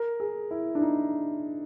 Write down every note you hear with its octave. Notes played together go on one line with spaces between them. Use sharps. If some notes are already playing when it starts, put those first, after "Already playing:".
Already playing: A#4
G#4
E4
D4
D#4